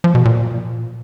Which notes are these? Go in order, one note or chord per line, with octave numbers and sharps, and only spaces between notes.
F3
B2
A#2